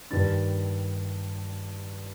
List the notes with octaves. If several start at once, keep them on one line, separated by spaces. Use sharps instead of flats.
G2 D#3 G3 D4 A6